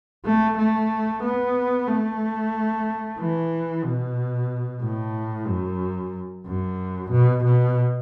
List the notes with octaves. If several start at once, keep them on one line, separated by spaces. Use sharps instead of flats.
A3
A3
B3
A3
E3
B2
A2
F#2
F#2
B2
B2